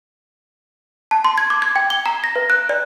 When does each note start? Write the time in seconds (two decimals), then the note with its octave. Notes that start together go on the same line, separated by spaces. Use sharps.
1.11 A5
1.24 C6
1.38 G#6
1.50 D6
1.62 G#6
1.76 G5
1.90 G7
2.06 A#5
2.24 A#6
2.36 B4
2.50 F#6
2.69 D5